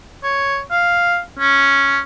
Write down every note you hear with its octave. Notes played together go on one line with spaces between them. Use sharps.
C#5
F5
C#4